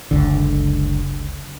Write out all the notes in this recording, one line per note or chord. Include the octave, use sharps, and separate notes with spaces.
F#1 C#2 D3